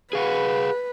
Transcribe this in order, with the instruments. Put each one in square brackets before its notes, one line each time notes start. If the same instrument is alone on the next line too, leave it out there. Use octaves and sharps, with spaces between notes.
[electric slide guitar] G#4 F5 F#5 [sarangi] B4